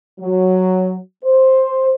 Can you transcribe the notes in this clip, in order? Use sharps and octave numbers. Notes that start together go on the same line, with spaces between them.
F#3
C5